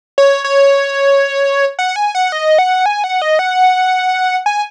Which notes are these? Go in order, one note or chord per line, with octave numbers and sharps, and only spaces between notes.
C#5
C#5
F#5
G#5
F#5
D#5
F#5
G#5
F#5
D#5
F#5
G#5